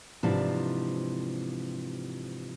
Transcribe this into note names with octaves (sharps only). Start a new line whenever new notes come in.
G#2 C3 E3 F3 D4